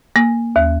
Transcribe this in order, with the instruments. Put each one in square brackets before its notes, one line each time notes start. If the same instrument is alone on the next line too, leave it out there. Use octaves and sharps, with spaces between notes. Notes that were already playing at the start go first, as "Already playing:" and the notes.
[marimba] A#3
D#2